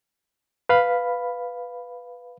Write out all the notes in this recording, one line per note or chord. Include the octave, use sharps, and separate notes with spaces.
B4 F5 B5